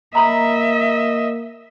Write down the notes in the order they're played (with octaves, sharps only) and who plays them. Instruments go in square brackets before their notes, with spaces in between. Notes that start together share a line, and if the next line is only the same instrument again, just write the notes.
[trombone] A#3 [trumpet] D#5 [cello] E5 [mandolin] A#5 B5 D#6